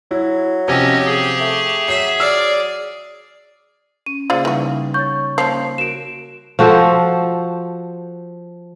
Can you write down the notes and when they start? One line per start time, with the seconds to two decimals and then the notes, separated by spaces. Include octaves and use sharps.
0.11 F#3 E4
0.68 C3 F3 C#4 G4 C#5 D#5
1.06 G#4
1.40 A3
1.88 F#3 E5 C7
2.20 D5 E6 F6
4.06 C#4 D#7
4.30 C#3 A#3 F4 G#4 C5 D5
4.45 C#3 E3 G3 D#4 F#4
4.94 C#5 C#6 G6 A6
5.38 F3 A#3 C#4 C7
5.78 F#4 A#4 D7 E7
6.59 F3 F#4 A4 C5